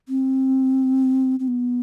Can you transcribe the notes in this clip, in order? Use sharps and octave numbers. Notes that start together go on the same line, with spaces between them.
C4
C4
B3